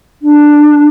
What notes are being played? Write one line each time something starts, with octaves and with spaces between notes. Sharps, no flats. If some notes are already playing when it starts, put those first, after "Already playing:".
D4